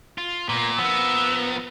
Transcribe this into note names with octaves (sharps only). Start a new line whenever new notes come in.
F4
A#2 A#3 B3
F3 B3 A#4 E6